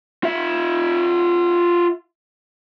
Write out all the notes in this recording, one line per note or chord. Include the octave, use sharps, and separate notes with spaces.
F4 E5